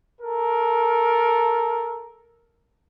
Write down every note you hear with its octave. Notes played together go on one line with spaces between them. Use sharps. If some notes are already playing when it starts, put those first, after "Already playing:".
A4 A#4